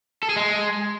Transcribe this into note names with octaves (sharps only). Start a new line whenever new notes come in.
A4
G#4
G#3